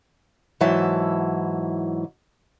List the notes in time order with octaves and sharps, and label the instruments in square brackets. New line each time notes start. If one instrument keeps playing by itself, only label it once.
[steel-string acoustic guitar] G#2 E3 F#3 E4 E5 A5